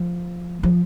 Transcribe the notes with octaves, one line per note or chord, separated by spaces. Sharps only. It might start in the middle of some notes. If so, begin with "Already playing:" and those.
Already playing: F3
F3